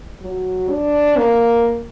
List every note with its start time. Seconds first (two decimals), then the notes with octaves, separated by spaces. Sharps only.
0.22 F#3
0.70 D4
1.17 A#3